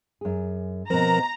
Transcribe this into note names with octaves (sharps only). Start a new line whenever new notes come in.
F#2 G#4
B2 F3 C4 A#4 A#5